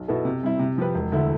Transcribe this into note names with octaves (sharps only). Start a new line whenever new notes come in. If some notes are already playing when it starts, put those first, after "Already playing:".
Already playing: B1
B2 B3 E4 A4
C3
G3 C4 E4
C3
F3 C4 G4 B4
E1
D2 D3 A3 E4